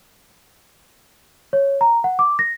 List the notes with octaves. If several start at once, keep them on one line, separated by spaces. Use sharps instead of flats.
C#5
A#5
F#5
D6
A#6